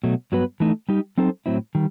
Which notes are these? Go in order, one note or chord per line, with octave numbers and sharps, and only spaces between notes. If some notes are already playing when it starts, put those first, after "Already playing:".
B2 F#3 A3
G2 F#3 B3 F#4 B4
E3 A3 D#4
G3 D#4 G4
F#3 C4 D#4 A4 C5
A2 F#3 C4 E4
D#3 G3